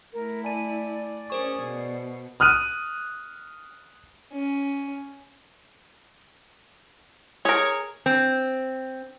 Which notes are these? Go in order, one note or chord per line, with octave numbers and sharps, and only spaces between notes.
A3 E4 A#4
D5 G#5 A5 D#7
C#4 G#4 A#4 C5 C#6
B2
D#6 F6 F#6 D#7
C#4
G#4 A#4 C#5
C4